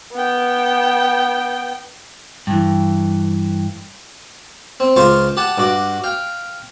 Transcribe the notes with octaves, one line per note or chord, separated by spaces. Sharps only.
B3 G5
G2 E3
C4
C#2 F4 C5 F5 C#6
G4 F#5 A5
G2 F#4 D6
F5 G5